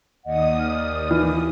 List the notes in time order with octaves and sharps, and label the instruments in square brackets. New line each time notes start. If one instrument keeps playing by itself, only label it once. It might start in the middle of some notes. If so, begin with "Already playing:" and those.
[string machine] D#2 D#6 [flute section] D5 D#5 F#5
[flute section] D5 F6
[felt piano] E3